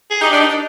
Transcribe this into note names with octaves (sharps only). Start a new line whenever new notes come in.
G#4
D#4 G4
D4
D#4
D4